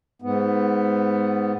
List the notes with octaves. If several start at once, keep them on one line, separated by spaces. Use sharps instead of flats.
G#2 B3